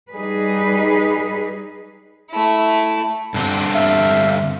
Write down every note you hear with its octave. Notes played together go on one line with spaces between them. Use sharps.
G3 D#4 G#4 B4
A3 E4
G2 D3 C4
E5 F5